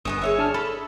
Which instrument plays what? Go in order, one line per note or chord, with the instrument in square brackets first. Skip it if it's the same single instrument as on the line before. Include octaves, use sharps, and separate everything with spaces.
[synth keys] G1 D#6 [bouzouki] D#3 G3 B3
[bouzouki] G#4 C#5 E5
[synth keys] D4 A5 F6
[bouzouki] A4 [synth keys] B5